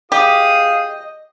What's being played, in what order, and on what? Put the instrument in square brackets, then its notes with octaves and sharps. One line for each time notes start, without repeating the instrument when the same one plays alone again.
[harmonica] F4 G#4 D#6 [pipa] G4 [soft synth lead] D#5